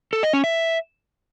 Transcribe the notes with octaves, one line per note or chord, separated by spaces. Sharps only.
A4
D#5
C#4
E5